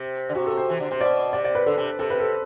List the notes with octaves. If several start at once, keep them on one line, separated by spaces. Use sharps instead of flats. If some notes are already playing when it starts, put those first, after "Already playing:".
Already playing: C3
D3
C3 F#4
A4
C5
E3
D3
C3 C5
B2 D5
C3 D5
D5
B4
D3 A4
C3
C3 A4
B4
A4